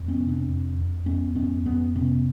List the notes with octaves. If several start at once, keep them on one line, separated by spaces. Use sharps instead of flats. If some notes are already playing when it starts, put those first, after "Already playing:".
Already playing: F2
B3 C#4
C3
C4 D4
F2
F2
F2 B3 C#4
F2 B3 C#4
F2 B3 C#4
C3 B3 C#4